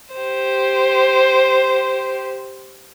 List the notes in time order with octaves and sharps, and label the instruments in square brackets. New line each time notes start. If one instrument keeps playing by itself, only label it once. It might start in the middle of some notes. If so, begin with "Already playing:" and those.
[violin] G4 C5